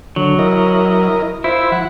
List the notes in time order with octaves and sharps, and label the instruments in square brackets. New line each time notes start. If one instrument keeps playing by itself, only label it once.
[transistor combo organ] D3 [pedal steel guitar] F#3
[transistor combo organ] E4 A#4 D#5
[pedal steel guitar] E4 [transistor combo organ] F4 C5 E5
[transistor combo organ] F3 F#5